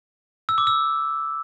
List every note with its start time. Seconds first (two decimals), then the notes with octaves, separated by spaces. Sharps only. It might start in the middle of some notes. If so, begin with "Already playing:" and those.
0.49 E6
0.58 D6
0.67 E6